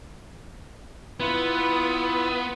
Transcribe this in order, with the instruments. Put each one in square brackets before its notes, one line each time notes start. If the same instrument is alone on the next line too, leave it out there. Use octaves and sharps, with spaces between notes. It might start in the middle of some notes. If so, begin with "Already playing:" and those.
[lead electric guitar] B3 [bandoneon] E4 F4 B4